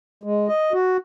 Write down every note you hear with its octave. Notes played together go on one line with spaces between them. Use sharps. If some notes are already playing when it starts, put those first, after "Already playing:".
G#3
D#5
F#4